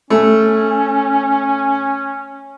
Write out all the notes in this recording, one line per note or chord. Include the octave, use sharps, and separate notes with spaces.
A3 C#4